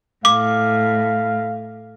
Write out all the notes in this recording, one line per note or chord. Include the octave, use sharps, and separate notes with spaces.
A2 F5 D6